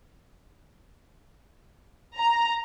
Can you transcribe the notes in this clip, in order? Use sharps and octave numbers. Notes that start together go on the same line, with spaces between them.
A#5